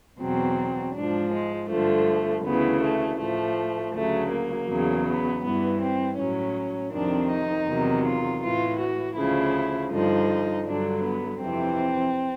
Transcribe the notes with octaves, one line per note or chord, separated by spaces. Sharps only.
E2 B2 F#3 C4
G#2 F3 D4
G#3
G2 D3 F3 A3
D2 C#3 E3 B3
A3
A2 F3 A3
D2 C#3 F#3 A3
A#3
E2 C#3 F#3
B3
G2 E3 B3
C4
A2 F#3 C#4
F2 C3 D#3 D4
D#4
E2 C3 D#3 F#3
F4
A2 E3 F4
F#4
D2 C#3 F3 E4
G2 D3 F3 D#4
G2 D3 F#3 D4
B3
F2 C3 E3 C4